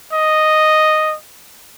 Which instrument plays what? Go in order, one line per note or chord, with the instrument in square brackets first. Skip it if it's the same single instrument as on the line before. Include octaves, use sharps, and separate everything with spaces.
[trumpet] D#5